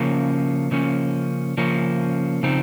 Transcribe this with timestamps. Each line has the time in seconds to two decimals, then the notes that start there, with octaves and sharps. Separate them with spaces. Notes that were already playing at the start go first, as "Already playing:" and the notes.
Already playing: C#3 F3 A#3 C#4
0.71 C#3 F3 A#3 C#4
1.57 C#3 F3 A#3 C#4
2.43 C#3 F3 C4 D#4